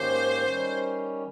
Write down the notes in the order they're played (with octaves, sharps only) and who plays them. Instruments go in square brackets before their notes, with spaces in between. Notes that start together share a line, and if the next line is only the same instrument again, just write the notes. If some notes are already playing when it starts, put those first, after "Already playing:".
Already playing: [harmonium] G#2 D#3 A#3 C#4 G4 [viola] C5
[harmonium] D#3 G3 C#4